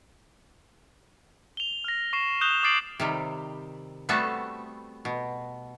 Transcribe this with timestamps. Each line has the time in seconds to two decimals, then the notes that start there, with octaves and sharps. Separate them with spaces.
1.57 F7 G7
1.84 F6 A#6
2.13 C#6 A#6 C7 E7
2.41 D#6 F#6 G6 E7 F7 G7
2.63 D6 D#6 A6 C7 D7 F#7
3.00 C3 D#3 G3
4.09 G3 A3 B3 C4 F#4 A4
5.05 B2